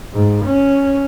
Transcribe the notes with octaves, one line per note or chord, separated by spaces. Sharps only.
G#2
C#4